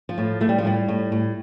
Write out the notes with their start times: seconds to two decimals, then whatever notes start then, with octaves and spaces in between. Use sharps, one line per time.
0.09 F3
0.18 A2
0.41 A2 A3
0.49 G3
0.58 F3
0.65 A2 G3
0.88 A2
1.12 A2